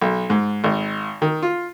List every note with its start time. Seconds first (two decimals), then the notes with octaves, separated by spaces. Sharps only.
0.02 B1
0.30 G#2
0.64 G#1
1.22 D#3
1.43 F4